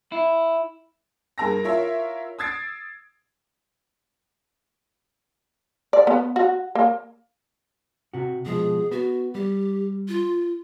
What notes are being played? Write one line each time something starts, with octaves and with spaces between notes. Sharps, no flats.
E4
G2 G#4 A#4 A#5 E6 A#6
E4 F4 A#4 C#5 E5
D#6 E6 G#6 A6 C7 D7
D5
B3
F#4
A#3
C3 F#4
B2 F3 G#3 G#4
B3 F#4
G3 G4
F4